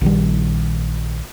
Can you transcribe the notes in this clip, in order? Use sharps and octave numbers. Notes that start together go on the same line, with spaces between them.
A#1 D#3 G3